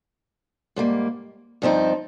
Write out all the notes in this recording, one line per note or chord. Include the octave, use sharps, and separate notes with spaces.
G#2 G3 A#3
G2 F3 C4 D#4